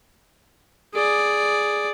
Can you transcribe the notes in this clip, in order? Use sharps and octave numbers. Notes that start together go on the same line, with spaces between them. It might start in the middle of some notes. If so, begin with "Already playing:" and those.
G#4 D5